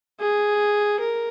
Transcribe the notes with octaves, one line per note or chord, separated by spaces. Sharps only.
G#4
A#4